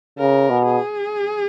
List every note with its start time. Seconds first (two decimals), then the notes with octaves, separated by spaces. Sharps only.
0.19 C#3 A#4
0.50 B2
0.65 G#4